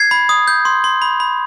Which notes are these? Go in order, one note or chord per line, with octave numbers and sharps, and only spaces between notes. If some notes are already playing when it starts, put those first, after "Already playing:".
Already playing: G#6 C7
B5
D#6
G6
C6
C6
B5
B5